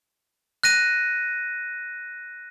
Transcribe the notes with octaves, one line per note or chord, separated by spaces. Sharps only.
F#6 A#6 D#7